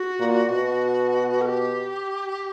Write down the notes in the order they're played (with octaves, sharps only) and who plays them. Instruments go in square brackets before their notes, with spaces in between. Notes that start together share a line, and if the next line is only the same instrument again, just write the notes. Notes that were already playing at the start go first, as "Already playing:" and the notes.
Already playing: [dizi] F#4
[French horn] A#2
B2
[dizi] A#4
G4